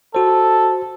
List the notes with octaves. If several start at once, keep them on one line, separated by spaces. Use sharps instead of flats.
F#4 A4 C5